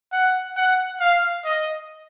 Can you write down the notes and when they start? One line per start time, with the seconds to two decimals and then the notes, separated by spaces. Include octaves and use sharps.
0.12 F#5
0.56 F#5
1.00 F5
1.45 D#5